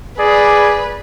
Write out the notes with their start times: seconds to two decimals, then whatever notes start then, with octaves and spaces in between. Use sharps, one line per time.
0.19 G#4 B4 D5